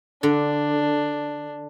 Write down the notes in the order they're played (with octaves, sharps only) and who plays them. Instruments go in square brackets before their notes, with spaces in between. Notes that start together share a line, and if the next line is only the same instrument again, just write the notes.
[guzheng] D3 [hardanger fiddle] D4